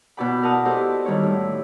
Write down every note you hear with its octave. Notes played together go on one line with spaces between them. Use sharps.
B2 E4 F#4 D5 G5 B5
E4 A#4 F#5 A5 D#6
E4 G4 A4 C5 D5 D#5
D#3 G3 E4 C#5
A2 E4